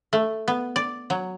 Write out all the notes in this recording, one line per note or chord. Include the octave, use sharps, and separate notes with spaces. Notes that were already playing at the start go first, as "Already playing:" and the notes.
A3
B3
D5
F#3